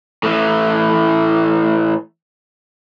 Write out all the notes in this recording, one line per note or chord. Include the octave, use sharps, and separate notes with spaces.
A2 E3